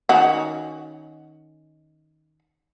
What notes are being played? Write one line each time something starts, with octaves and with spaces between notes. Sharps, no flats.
D#3 C#4 F#4